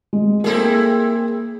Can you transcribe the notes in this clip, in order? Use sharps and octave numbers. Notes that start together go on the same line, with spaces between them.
G#3
A#3 C4 E4 G#4 A4